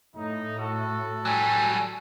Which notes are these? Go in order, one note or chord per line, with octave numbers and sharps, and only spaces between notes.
A2 D#4
F#4 A4
F#3 G3 G#5